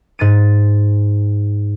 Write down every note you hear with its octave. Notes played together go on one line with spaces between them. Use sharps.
G#2 A6 D#7